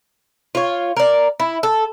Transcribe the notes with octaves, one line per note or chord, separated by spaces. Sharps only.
F4 C#5
A#4 D5
E4
A4